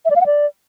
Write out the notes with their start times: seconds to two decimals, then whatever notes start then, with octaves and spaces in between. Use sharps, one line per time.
0.05 E5
0.10 D5
0.16 F5
0.21 F#5
0.26 D5